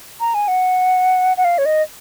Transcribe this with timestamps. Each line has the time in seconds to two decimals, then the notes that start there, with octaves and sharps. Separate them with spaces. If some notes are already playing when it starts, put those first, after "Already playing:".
0.20 A#5
0.34 G#5
0.48 F#5
1.37 F#5
1.45 F5
1.58 C#5
1.66 D#5